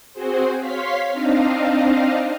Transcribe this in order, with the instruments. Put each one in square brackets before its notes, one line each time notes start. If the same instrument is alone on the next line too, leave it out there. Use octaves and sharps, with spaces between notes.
[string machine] C4 F#4 G#4 C5
C#5 F5 C6 B6
C4 D4 D#4 D#5 F5